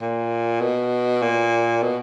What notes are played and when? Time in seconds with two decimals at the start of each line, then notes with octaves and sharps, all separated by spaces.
0.01 A#2
0.60 B2
1.22 A#2
1.82 B2